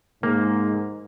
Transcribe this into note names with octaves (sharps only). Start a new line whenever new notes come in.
G#2 A#3